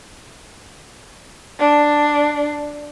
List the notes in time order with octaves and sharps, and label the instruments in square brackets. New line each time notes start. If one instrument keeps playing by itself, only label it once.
[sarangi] D4